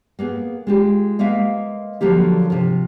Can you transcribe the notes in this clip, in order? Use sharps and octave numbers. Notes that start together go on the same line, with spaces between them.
A#3 B3 G#4
G#3 F4 G4
G#3 A#3 B3 E5 F5
D3 F3 F#3 A#3 G4
C3 F3